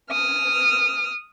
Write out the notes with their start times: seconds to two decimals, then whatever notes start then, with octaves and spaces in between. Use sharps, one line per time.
0.11 D#6 F6